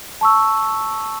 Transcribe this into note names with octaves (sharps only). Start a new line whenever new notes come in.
A5 C#6 E6